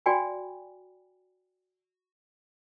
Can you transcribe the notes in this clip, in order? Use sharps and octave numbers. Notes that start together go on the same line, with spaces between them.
F#4 D5 G5 G#5 B5